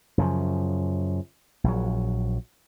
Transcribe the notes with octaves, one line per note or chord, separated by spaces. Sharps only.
F#2 C#3 F3
A#1 F#3